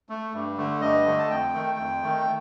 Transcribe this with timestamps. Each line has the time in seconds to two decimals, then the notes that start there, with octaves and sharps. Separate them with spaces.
0.09 A3
0.34 G2
0.57 D3 A3
0.81 G2 D#5
1.05 D3 A3
1.19 A5
1.30 F2 G5
1.54 D#3 A3
1.78 F2
2.02 D#3 A3